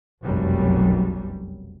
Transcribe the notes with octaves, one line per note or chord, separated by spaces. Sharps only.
F1 B1 F#2 F#3 G3